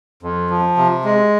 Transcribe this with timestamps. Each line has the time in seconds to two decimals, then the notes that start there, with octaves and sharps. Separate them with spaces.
0.23 F2
0.50 F3
0.77 C3
1.04 G#3